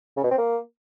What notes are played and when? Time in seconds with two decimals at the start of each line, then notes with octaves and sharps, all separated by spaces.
0.17 C#3
0.24 B2
0.31 C4
0.38 A#3